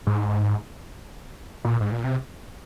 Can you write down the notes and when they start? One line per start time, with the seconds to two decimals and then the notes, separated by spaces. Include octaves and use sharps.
0.07 G#2
1.65 A#2
1.81 G#2
1.92 A#2
2.04 C3